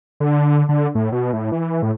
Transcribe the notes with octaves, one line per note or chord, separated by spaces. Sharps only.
D3
D3
A2
B2
A2
E3
A2